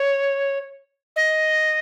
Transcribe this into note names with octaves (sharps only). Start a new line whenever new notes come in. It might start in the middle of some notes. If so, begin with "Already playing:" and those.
Already playing: C#5
D#5